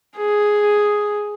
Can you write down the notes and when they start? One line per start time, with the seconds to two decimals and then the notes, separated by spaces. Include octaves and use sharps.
0.17 G#4